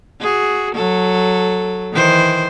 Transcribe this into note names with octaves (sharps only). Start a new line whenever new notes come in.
F#4 G#4
F#3 A4
D#3 E3 C5